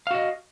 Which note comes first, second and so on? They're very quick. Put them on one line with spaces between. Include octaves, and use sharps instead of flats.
F5 F#4 D#5